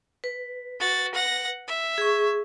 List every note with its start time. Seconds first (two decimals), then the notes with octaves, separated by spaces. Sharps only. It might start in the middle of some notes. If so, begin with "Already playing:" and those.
0.24 B4
0.80 F#4 A6
1.15 F#5 A#6
1.68 E5
1.98 G#4 C#6